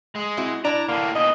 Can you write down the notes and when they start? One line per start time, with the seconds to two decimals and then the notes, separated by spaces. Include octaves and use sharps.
0.16 G#3
0.37 C4 E4 F#4
0.65 D4 E4 D5 A#5
0.89 A2 D3 A#3
1.15 B2 E3 D#5